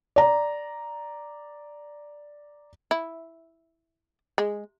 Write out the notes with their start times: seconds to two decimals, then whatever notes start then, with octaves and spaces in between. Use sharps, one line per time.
0.16 D5 A#5
2.91 E4
4.38 G#3